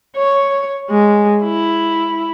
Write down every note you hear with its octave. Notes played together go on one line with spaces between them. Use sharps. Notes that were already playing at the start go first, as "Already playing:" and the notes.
C#5
G#3
E4